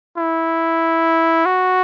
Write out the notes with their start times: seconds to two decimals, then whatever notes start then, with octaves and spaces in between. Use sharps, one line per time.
0.18 E4
1.46 F#4